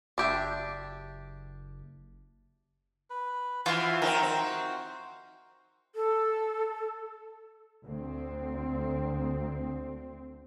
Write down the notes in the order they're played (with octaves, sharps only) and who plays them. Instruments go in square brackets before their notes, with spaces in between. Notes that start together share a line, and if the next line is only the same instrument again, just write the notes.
[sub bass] F#1 [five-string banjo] D4 G4 E5
[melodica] B4
[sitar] E3 [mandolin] F4 F5 [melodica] F#4 C5
[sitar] D#3 C4 [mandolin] A#4
[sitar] C4
[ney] A4
[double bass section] D2 C4